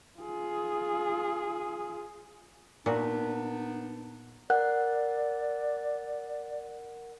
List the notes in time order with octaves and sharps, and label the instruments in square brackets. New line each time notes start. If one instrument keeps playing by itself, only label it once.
[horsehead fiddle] F4 G#4
[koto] A#2 F#4 [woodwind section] B3 D4 D#4
[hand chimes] A#4 F#5 F#6 [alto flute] D5